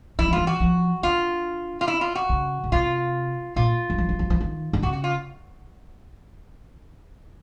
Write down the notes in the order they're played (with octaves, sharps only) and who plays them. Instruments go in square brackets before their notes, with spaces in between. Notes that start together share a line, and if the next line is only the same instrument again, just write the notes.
[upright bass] E3 [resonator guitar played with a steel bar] E4
[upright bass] F3
[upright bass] E3 [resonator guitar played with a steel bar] F4
[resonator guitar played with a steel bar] F#4
[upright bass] F3
[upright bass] D3 [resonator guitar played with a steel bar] F4
[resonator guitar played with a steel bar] F4
E4
F4
F#4
[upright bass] C#3
C#3
[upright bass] C3 [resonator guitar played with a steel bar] F4
[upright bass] A#2 [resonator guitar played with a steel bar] F4
[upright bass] F#3
F3
F#3
F#3
F3
D#3
D3
[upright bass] C#3 [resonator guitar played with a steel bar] F#4
[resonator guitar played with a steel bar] F#4
F4